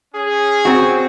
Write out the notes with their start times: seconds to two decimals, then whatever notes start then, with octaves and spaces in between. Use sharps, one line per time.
0.14 C#4 G#4
0.65 C4 F#4